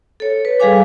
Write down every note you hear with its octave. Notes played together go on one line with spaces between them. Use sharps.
A4 C#5
B4
G3 G#4 A4 F5 G#5 D6